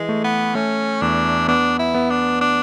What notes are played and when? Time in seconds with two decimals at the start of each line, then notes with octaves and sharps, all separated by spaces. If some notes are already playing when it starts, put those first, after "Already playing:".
Already playing: E3 G#3
0.09 A3
0.24 B3
0.55 A3 C#4
1.02 E2 D4
1.48 B3 D4
1.79 E4
1.95 B3
2.10 D4
2.41 D4